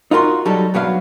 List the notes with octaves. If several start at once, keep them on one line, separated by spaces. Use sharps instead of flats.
D#4 F4 F#4 A#4 A5 C6
F#3 G3 D#4 A4
G2 F#3 B3 G#4 F5